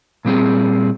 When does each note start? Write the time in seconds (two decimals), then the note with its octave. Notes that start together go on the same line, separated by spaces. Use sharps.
0.25 A#2 G3 C4 G#4